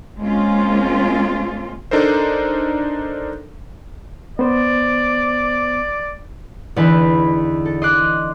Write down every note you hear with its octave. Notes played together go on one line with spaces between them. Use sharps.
G#3 A#3 C4 C#4 F4
D4 D#4 A4 A#4 C5
B3 C5 D5
E2 D3 D#4 B4
A4
D#5 C6 D6 F#6 C7